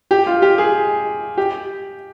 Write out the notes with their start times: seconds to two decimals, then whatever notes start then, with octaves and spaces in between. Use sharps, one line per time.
0.11 G4
0.26 F4
0.42 G4
0.58 G#4
1.37 G4